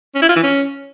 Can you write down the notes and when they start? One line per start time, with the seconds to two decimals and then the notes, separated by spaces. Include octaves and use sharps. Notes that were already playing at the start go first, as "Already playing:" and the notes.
0.15 C#4
0.22 E4
0.29 F4
0.36 E3
0.43 C#4